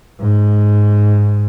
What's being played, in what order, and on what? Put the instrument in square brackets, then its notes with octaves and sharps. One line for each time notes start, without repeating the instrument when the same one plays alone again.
[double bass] G#2